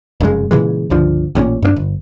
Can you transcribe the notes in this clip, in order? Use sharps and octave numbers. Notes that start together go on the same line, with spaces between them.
F1 F#2 C#3 G#3
A#2 C#3 E3 G#3
G1 C#2 D3 F3
A1 G2 A#2 C#4
G2 A#3 D4
G1